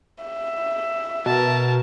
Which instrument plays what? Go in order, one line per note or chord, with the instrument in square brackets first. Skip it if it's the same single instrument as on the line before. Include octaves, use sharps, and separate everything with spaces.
[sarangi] E5
[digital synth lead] B2 [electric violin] A#4 A5